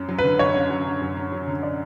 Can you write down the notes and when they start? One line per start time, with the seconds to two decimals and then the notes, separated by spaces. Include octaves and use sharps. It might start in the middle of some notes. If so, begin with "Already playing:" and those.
Already playing: F#2 C#4
0.09 F#3
0.19 B4
0.24 D3
0.39 F#2 C#5
0.54 C#4
0.70 F#3
0.85 D3
1.02 F#2
1.16 C#4
1.32 F#3
1.47 D3
1.63 D5